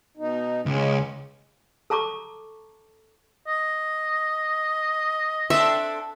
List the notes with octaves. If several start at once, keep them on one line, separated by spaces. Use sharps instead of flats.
B2 D#4
C#2 G#3 C#4
A4 A5 A#5 C#6 D6
D#5
C4 D4 A4 E5